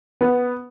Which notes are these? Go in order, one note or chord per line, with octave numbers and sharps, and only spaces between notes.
B3